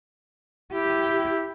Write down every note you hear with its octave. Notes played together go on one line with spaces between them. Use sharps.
E4 G4